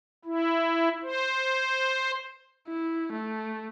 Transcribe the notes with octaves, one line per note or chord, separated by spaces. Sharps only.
E4
C5
E4
A3